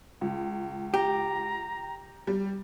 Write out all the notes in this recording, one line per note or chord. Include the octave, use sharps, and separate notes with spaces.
C#2
G4 A#5
G3